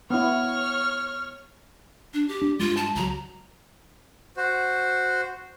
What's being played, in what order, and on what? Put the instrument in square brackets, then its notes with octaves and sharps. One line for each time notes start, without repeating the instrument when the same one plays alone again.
[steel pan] B3 E4 [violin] C#5 F6
[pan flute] D4
G4
[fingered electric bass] D4
[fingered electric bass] G2 G#3 [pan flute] F4
[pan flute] A5
[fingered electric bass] C#2 F#3 [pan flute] A#5
[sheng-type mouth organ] F#4 C5